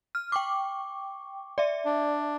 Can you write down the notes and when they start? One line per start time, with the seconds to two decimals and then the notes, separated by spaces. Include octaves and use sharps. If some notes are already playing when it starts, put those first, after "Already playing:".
0.15 F6
0.32 G5 C#6 D6
1.58 D5 E5
1.85 D4